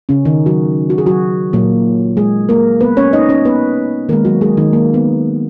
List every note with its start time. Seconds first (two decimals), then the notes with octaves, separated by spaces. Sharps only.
0.09 C#3 C#4
0.25 D#3 D#4
0.46 F#3 F#4
0.90 F#4
0.98 G#4
1.06 F#3 F#4
1.53 A#2 F#3 A#3
2.17 G#3 G#4
2.49 A#3 A#4
2.81 B3 B4
2.97 C#4 C#5
3.13 D#4 D#5
3.29 C#4 C#5
3.45 B3 B4
4.09 D#3 A#3 A#4
4.13 G#3
4.25 F#3 F#4
4.41 G#3 G#4
4.57 D#3 D#4
4.73 A#3
4.94 B3